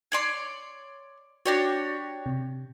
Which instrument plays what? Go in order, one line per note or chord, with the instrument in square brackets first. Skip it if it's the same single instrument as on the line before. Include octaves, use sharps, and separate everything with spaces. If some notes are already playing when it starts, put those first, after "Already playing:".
[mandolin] C#5 D5 C6
[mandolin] D4 G4 C#5 [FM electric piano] F#4 D5 A#6
[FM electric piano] C3